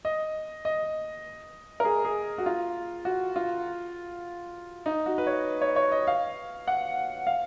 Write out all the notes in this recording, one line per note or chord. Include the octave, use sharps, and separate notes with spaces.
D#5
D#5
A#4
G#4
G#4
F#4
F4
F#4
F4
D#4
F#4
B4
C#5
C#5
C#5
D#5
F5
F#5
F5